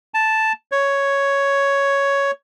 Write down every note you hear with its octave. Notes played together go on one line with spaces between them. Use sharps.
A5
C#5